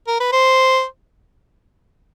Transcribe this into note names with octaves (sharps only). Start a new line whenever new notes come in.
A#4
B4
C5